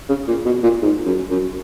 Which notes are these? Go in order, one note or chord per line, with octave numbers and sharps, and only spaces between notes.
C#3
A#2
B2
A#2
G#2
F#2
F#2